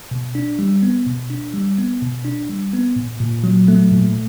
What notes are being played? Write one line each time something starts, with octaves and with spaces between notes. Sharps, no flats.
B2
D4
G3
B3
B2
D4
G3
B3
B2
D4
G3
B3
A#2
A#2
F#3
A3
A#2